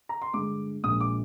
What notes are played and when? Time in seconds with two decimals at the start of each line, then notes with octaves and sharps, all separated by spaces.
0.09 A#5
0.22 C6
0.34 G2 D3 G#3 D6
0.83 A#1 A#2 G#3 D#6
1.00 D6